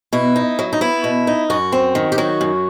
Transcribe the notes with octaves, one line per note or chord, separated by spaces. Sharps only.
B2 E4
D#4
F#3
D#4
B3 E4
B2
D#4
F#2 F#4
C4
D#3
G4
F#3 F#4
F#2